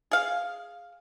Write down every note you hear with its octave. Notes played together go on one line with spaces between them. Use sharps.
G#4 F5